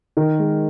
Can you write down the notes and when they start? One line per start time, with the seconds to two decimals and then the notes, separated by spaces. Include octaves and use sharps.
0.17 D#3 A#4
0.39 G#3